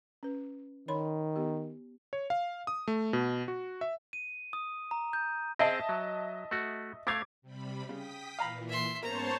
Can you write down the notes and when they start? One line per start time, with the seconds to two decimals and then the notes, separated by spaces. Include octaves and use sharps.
0.23 C#4 B4
0.88 D#3 C#5 B5 C6
1.36 B3 G4
2.13 C#5
2.30 F5
2.67 D#6
2.88 A3
3.13 B2
3.48 F#4
3.81 E5
4.13 D#7
4.53 D#6
4.91 A#5
5.13 G6
5.59 C4 G#4 D#5 E5 G5 A5
5.89 F#3
6.51 A3 F#4
7.07 A3 F5 D6 G#6
7.42 C3 G3 B5
7.89 C#3 G5 D#6 B6
8.39 A#2 E3 F5 A#5 B5
8.69 E5 C6
9.03 G#2 A#3 B3 C#4 C5 C#5 A5 A#5